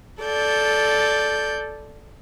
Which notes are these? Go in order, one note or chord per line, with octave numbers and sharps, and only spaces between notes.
A4 D5 G6